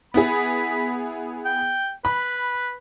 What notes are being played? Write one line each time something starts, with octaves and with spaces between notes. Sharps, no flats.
B3 E4 G#4 B5
G5
B4 B5